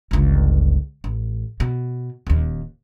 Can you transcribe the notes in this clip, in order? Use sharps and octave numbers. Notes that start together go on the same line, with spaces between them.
G1 C#2
A1
B2
D#1 D#2